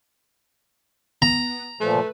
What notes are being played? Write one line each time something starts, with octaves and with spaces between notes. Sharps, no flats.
B3 A#5
A#2 F3 A3 B4